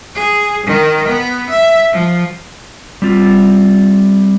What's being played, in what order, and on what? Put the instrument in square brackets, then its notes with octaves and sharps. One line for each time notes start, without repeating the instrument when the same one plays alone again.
[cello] G#4
D#3
B3
E5
F3
[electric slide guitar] G3 C4 F4